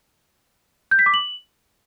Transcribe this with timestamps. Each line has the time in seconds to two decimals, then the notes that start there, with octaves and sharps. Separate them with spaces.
0.91 G6
0.99 B6
1.06 D6
1.14 F#7